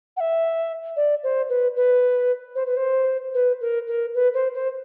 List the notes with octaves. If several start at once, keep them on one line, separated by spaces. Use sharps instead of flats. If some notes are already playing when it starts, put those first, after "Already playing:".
F#5
E5
D5
C5
B4
B4
C5
B4
C5
B4
A#4
A#4
B4
C5
C5